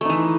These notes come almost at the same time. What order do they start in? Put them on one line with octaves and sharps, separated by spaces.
A3 D#4 E3